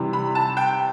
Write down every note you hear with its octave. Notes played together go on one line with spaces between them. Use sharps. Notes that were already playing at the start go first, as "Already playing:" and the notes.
Already playing: C3 E3 G3
B5
A5
G5